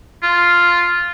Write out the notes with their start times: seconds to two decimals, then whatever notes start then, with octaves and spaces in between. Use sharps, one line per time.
0.23 F4